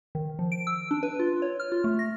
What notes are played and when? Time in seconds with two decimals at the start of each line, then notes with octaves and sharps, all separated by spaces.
0.15 D#3
0.39 F3
0.52 D7
0.67 E6
0.91 D4
1.03 B4
1.19 F4
1.42 C#5
1.60 F6
1.72 F4
1.84 A3
1.99 A#6